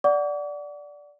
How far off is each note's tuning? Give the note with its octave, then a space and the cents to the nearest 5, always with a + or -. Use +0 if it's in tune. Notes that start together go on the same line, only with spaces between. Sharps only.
D5 -5 F#5 +0 D6 -45